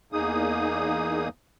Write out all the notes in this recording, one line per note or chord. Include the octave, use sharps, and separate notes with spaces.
E2 A#3 D#4 G#4 D#6